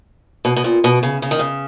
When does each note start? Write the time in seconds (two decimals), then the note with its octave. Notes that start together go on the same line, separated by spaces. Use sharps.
0.45 B2
0.56 B2
0.64 A#2
0.84 B2
1.03 C#3
1.22 C#3
1.31 D#3
1.39 C#3